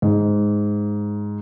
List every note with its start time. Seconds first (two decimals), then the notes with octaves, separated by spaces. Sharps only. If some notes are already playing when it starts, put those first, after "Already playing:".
0.02 G#2